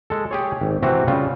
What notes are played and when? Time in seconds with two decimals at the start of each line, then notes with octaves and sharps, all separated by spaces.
0.10 G#3 A4
0.31 G4 G#4 C#5
0.61 G#1
0.83 C3 E3 C4 F#4
1.08 C#3 G3 F4